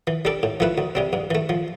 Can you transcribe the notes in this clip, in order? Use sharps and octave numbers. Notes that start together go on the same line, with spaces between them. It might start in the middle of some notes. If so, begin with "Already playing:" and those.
E3
G3 D4 A4 D5
A2
F3 A3 E4 B4
D2
C3 G3 C4
G2
E3 A3
F3